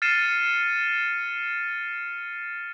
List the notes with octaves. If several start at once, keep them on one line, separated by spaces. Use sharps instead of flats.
F6 A6 C7 C#7 D#7 E7